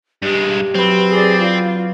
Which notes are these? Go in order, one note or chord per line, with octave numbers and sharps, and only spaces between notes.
G2 G#3 G4
F#3 C4 B4
G#4 D5
F4